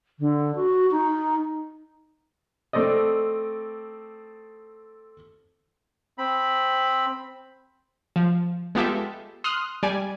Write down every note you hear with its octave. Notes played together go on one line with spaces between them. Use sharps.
D3
F#4
D#4
A3 C4 A4 D5 D#5
C4 B5
F3
G#3 B3 F4 G4 A4 E5
C6 D#6 F6 F#6
G3 D5 G#5